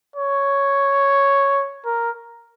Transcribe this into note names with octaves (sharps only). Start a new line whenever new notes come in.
C#5
A#4